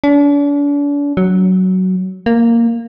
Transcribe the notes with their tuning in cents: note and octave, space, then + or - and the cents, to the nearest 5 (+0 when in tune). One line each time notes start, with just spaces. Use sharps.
D4 -40
F#3 +10
A#3 -5